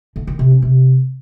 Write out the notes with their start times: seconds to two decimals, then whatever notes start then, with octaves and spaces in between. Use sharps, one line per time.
0.16 D3
0.27 D#3
0.39 C3
0.51 C#4
0.62 C3